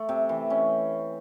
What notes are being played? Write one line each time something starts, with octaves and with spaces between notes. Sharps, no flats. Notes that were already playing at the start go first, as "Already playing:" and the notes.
Already playing: A3
C3
E3
C#4